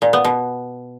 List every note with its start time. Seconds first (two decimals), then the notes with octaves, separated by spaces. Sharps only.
0.02 A#2
0.13 B3
0.25 B2